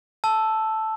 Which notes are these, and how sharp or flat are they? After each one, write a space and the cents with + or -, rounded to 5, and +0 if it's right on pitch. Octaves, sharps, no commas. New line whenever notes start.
A5 +0 E6 +0